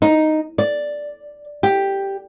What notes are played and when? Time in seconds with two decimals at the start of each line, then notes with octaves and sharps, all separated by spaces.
0.02 D#4
0.58 D5
1.63 G4